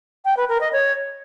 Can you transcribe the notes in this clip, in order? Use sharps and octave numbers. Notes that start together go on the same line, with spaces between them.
G5
B4
A#4
D#5
C#5